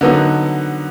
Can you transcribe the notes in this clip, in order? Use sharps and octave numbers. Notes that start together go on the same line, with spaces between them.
D3 F#3 B3 D#4